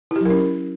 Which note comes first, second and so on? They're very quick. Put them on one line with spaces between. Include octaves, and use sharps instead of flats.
E4 G4 F#3 A#4 C#4